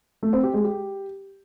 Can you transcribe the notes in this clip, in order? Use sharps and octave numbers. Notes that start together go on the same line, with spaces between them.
A3
C4
G4
G#3
G4